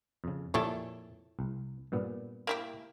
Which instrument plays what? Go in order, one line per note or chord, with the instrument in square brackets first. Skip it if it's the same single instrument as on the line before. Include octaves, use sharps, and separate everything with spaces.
[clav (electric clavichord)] F2 C#3
[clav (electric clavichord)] F2 A#2 G4 [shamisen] E4 A4 C#5
[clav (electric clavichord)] C2
G2 A#2 B3
[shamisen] A#3 E4 G4